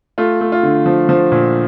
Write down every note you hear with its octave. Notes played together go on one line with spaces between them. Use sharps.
A3 F4
A3
F4
D3
F3
F3
A#2